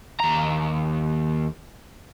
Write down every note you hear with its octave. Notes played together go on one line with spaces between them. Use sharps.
D#2 A#5